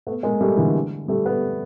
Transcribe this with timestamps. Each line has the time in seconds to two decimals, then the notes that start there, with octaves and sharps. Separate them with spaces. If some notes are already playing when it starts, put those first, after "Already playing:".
0.07 A3 B3
0.23 G#3 A#3
0.41 G3 A3
0.57 D3 E3
1.08 G3 A3
1.26 A3 B3